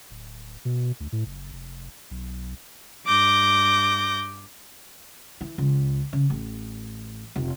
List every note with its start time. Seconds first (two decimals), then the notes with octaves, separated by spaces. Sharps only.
0.11 D1
0.65 B2
1.00 D2
1.12 A2
1.26 F#1
1.53 F1
2.11 B1
3.05 G2 D6 G6 A#6
5.41 E3
5.58 C#2
6.13 C#3
6.30 A1
7.36 F1